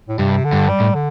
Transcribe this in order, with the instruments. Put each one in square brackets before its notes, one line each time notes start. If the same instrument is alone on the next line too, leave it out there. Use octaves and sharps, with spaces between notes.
[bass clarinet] A2
[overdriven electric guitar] G2 [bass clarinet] C3
[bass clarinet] D3
[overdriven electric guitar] G2
[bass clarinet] G3
[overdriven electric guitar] A2
[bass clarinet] D3